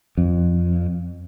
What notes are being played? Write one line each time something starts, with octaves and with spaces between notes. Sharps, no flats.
F2